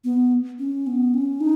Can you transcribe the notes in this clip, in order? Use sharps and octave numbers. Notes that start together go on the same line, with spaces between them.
B3
C#4
B3
C#4
D#4